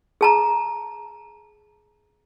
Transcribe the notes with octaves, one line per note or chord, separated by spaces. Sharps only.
G#4 A5 A#5